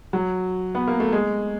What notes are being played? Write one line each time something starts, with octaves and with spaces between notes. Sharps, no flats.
F#3
B3
A#3
A3
G#3